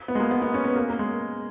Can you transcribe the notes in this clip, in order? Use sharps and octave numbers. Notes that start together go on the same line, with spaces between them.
B3
G#3
A#3
B3
B3
C#4
B3
A#3
A#3
G#3